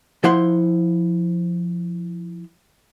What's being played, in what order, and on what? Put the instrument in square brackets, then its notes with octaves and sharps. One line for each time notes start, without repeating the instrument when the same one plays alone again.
[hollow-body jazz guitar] F3 E4 C5 F#5 C6